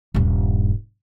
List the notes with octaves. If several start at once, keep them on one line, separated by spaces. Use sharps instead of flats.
D#1 G2